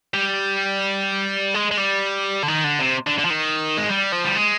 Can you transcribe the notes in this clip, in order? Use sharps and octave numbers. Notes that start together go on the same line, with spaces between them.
G3
G#3
G#3
G3
D3
D#3
D3
C3
D3
D3
F3
D#3
G#3
G3
F3
G3
G#3